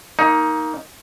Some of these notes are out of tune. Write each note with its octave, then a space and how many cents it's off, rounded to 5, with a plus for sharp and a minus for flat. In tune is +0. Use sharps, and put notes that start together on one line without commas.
A#3 +0 D#4 +15